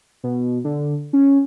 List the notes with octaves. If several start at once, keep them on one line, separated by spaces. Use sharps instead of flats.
B2
D3
C#4